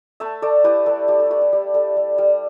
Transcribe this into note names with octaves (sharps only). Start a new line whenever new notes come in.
A3 E5 A5
A3 A4 D5
E4 G4 B4
G3 A4
A3 G4
A4
A3 G4 B4 D5
G4
G3 G4
G3 A4
G3
G3